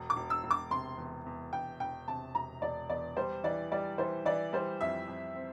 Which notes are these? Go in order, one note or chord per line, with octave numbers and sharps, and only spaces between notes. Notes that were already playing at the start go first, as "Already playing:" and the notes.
Already playing: E1
D6
E1
E6
E1
D6
C3 C6
E2
E2
E1 G5
E1 G5
C3 A5
E1 A#5
E1 D5
E2 D5
G3 C5
E3 D5
G3 D5
E3 C5
E3 D5
G3 C5
F2 E5
F2
C4